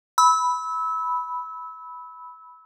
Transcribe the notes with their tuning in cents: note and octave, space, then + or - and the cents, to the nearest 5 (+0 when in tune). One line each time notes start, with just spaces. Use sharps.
B5 +0 E6 -25